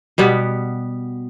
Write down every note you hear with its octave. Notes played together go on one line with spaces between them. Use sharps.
B2 G3 B3